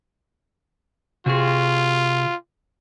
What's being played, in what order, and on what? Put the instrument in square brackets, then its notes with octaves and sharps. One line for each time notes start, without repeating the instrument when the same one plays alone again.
[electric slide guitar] C3 F#4 G#4 [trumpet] F4